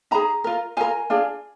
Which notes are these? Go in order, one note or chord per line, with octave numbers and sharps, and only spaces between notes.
D#4 G#4 A#5
F4 A#4
F4 A#4 G#5
D4 F4 G#4